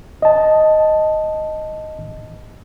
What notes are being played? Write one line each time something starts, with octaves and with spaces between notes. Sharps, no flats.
D#5 A5